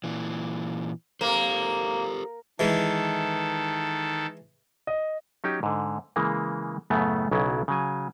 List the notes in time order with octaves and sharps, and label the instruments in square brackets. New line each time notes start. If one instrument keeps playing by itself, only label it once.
[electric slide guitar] A#2 E3
[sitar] A#3 [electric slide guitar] G4 A4 C5
[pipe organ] D#3 A4 [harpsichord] E3 G#3
[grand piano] D#5
[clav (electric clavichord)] F#3 C#4 D#4 G4
G#2 D3
C#3 E3 G#3 A#3
F#2 A2 C#3 A3 B3
B1 C#3 F#3 B3 E4
C#3 F#3 G#5